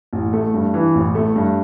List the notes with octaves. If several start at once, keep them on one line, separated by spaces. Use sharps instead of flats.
A1
A3
G2
E3
A1
A3
G2